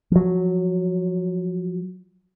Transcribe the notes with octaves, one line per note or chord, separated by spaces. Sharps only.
F3 F#3